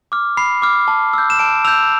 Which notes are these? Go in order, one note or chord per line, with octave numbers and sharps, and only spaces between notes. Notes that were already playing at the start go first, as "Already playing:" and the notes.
D6 F6
B5 C7
D6 F6
A5
E6 G6
E7
A5 D7
E6 G6 F7